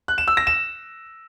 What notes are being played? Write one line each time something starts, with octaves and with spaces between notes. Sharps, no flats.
F#6
E7
E6
A#6
E7